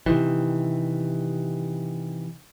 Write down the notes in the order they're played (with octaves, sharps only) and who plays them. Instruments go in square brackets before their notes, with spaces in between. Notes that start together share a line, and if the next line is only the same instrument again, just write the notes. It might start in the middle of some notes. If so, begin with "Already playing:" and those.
[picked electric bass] C3 D#3 E3